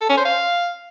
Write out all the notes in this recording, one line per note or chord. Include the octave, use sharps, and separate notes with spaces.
A4
C#4
C5
F5